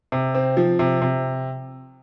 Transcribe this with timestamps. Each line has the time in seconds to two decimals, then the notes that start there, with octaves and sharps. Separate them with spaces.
0.12 C3
0.35 C4
0.57 F3
0.79 C3
1.02 C3